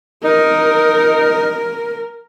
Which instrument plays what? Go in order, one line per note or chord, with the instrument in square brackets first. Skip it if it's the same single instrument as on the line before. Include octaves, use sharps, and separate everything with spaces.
[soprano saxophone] D#4 [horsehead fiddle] A#4